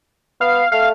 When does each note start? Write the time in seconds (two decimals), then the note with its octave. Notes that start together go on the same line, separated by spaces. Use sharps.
0.41 B3 F5
0.72 A3 F5